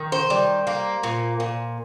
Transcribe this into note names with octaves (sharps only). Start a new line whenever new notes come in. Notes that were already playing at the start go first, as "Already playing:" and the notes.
Already playing: D#3
C5
G3
A#3
A#2
A#2